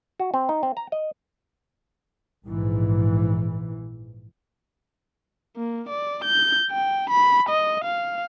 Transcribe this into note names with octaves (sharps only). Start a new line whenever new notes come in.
F#4
C4
D#4
C4
A#5
D#5
A#1 G#2 E3
A#3
D5
G6
G5
B5
D#5
F5